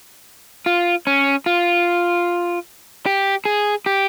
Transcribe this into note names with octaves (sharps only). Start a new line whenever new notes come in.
F4
C#4
F4
G4
G#4
G4